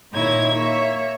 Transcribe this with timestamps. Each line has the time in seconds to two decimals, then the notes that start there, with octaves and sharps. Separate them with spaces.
0.12 A#2 D#3 D#4 E4 C#5 G#6
0.54 A#3 C#5 E5